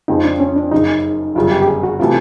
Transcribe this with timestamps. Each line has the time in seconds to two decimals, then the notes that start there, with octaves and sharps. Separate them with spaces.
0.08 F2 C#3 F3 G#3 D#4
0.24 D4
0.40 C#4
0.56 D4
0.71 F#1 F#2 C#3 D#4
1.35 G1 F#2 C#3 F4
1.52 G4
1.62 G4
1.68 G#4
1.83 F#4
2.00 C3 E3 A3 F4